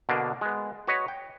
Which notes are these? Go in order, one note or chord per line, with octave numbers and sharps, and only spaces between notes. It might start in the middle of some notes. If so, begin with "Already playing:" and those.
B2 D3 A#3 D4
G#3 B3
F#4 B4 C#5 D#5
G5